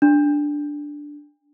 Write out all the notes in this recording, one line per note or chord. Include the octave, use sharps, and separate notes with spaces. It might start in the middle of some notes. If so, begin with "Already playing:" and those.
D4